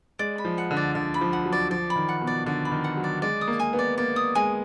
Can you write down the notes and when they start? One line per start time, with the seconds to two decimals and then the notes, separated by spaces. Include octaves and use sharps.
0.19 G#3 D5
0.38 B5
0.45 F3
0.58 F#5
0.71 D3
0.77 D5
0.95 D3 D5
1.14 B5
1.21 F3
1.33 F#5
1.46 F#3
1.52 D5
1.70 F3 D5
1.90 B5
1.96 D#3
2.09 F#5
2.22 B2
2.27 D5
2.46 D3 D5
2.65 B5
2.72 D#3
2.84 F#5
2.97 F#3
3.04 D5
3.22 G#3 D5
3.41 D#6
3.48 A#3
3.60 G#5
3.73 B3
3.79 D5
3.98 A#3 D5
4.16 D#6
4.35 G#3 G#5